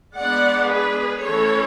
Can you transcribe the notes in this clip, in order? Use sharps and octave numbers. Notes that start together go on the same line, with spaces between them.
G#3 B3 D4 D5 F#5
G#4 B4
E3 A3 C#4 A4 C#5